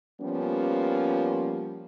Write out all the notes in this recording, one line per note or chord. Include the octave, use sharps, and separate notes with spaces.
F3 G3 A#3 B3 C#4